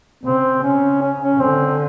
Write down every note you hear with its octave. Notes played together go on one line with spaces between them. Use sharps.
C#3 C4
C#3 C#4
C#4
C#4
D3 C4